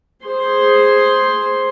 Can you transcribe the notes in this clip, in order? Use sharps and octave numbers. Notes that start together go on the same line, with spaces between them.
G#4 C5 C6